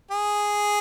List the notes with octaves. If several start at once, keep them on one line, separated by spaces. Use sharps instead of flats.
G#4